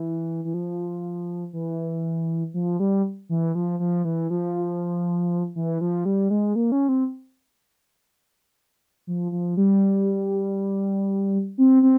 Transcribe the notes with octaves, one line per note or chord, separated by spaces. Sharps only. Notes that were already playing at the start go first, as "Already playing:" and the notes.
Already playing: E3
E3
F3
E3
F3
G3
E3
F3
F3
E3
F3
E3
F3
G3
G#3
A#3
C#4
C4
F3
F3
G3
C4
C4